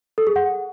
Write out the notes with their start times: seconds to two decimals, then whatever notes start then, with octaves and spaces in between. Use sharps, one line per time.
0.18 A4
0.27 G#4
0.36 F#5